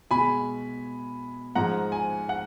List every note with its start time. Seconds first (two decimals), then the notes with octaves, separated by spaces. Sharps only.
0.11 B2 G#3 G#5 B5
1.55 G#2 F3 G#3 F#5 A#5
1.92 G#5
2.29 F#5